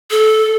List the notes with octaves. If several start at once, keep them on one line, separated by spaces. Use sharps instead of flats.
A4